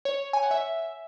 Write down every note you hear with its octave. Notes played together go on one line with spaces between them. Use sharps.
C#5
G#5
F#5
E5